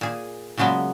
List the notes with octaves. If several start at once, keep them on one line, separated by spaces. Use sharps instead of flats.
A#2 G#4
A#2 C#3 F#3 G#3 B3